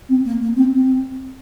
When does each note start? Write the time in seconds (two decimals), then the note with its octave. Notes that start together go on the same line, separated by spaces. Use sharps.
0.09 C4
0.25 A#3
0.41 A#3
0.56 C4
0.72 C4